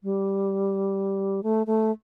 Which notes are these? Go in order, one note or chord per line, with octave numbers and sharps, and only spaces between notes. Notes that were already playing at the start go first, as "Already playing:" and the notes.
G3
A3
A3